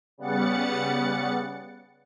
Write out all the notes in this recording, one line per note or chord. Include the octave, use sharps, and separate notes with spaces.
C#3 G3 B3 F#5 A6 C#7